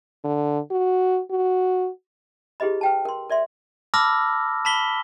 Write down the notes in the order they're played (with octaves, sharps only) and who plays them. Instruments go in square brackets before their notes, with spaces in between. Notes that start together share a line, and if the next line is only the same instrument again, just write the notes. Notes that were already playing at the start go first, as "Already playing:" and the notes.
[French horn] D3
F#4
F#4
[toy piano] E4 G4 G#4 B4 D#5 B5
B4 G5 A5
A#4 C6
A#4 D5 E5 C6
[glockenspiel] A5 B5 D6 E6 F6 A#6
A5 B5 B6 G7